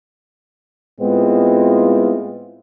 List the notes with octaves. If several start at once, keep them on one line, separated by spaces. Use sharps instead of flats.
A2 G#3 B3 C4 E4 F4